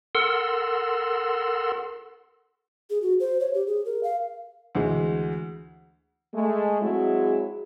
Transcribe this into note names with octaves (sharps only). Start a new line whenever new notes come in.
A4 A#4 F#5 C6 E6
G#4
F#4
C5
C#5
G4
G#4
A#4
F5
D2 E3 G#3
G#3 A3
F#3 G#3 C4 E4 G#4